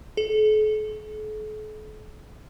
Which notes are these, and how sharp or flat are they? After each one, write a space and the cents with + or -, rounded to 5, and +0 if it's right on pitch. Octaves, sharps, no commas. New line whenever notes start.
A4 -45